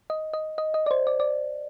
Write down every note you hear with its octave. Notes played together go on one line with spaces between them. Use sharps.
D#5
D#5
D#5
D#5
D5
C5
D5
D5